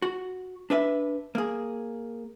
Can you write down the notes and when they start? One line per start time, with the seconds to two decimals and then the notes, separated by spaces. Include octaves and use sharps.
0.02 F#4
0.70 D4 B4 E5
1.35 A#3 G#4